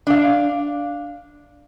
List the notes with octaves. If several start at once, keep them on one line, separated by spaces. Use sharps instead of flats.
D4 F5